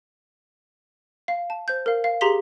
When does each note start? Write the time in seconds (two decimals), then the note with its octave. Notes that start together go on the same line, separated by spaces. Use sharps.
1.28 F5
1.50 A5
1.68 C5 G6
1.86 A#4 F5
2.04 F5
2.21 G4 G#4 A#5 C6 B6 G7